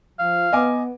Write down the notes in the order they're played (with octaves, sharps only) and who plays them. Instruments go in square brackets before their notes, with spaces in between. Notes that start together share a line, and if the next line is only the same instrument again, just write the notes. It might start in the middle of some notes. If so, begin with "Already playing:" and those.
[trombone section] F3 [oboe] F5
[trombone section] B3 [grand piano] D#5 G#5 D6